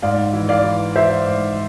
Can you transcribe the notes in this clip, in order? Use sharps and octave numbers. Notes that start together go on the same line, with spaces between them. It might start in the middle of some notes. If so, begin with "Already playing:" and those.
G#2 D5 F5
E3
D5 F5
E3
E3 C5 E5
G#2